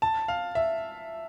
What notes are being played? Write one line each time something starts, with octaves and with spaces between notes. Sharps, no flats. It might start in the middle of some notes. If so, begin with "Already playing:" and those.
A5
F5
E5